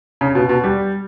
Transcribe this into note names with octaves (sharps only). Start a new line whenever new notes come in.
C#3
B2
B2
G3